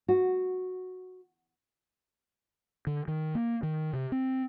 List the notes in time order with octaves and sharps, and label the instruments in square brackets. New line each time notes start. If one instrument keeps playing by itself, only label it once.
[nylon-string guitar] F#4
[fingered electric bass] D3
D#3
A#3
D#3
C3
C4